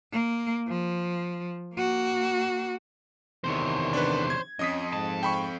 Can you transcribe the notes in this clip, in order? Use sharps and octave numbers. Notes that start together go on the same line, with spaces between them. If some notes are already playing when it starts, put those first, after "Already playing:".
A#3
F3
A#3 F#4
E2 C3 D#3 C5 C#5
D4 B4
G#6
F2 C#4 D#5 D#6 B6
G#2 A5
G5 B5 C#6